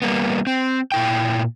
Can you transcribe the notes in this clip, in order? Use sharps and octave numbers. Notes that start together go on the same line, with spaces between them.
G3 A#3 B3
C4
A#2 E4 G5